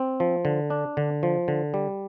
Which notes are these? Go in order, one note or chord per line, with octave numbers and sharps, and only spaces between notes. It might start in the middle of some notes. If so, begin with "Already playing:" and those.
Already playing: C4
F3
D3
D4
D3
F3
D3
G3